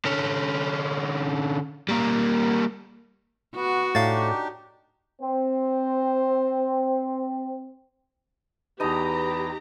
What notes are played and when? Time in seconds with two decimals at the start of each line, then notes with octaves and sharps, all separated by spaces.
0.05 D3 C#4
1.89 G3 A#3
3.55 B3 F#4
3.95 A2 D4 D#4 G4 F5 A6
5.21 C4 C5
8.80 E2 D#4 G4 B4 D#5 A5 A#5 D#7